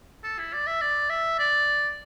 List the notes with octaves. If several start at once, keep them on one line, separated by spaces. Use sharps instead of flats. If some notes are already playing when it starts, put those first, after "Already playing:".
A4
E4
D5
E5
D5
E5
D5